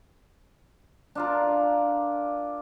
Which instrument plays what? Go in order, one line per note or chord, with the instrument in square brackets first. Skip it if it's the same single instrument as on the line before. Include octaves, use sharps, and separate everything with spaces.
[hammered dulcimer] D4 F4 A#4